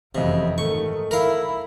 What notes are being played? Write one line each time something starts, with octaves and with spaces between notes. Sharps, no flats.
F#1 F2 C3 E3 D#5 F5
G#2 D#3 A3 C#6
E4 A#4 F5